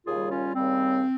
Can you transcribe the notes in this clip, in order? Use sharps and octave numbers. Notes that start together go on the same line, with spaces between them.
D#2 C#3 G3 F4 G#4
C#4 F4
D#2 C#3 G3 C4